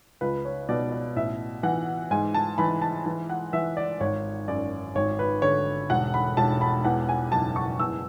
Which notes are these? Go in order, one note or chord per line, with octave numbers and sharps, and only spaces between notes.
C#2 B4
C#5
B2 D5
D5
A1 E5
E3 F#5
G#2 G#5
A5
E3 B5
A5
E3
F#5
E3 E5
D5
G#1 C#5
F#2 D5
G#1 C#5
B4
D3 C#5
E1 F#5
B5
E1 A5
B5
E2 F#5
G#5
F#1 A5
C#6
E2 E6